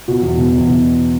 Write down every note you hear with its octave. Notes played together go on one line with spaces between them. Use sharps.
B2 F#4
E2
B2
E2
B2